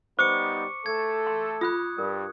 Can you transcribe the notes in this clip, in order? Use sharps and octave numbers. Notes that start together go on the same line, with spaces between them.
G3 B3 D#4 C5 C#6 D6 C#7
A3 A4 G#6
C6
F4 B5 D#6 F#6
G2 G3 A#4